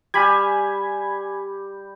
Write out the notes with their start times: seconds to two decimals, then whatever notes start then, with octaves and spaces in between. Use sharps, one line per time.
0.14 G3 G#5 B5 G#6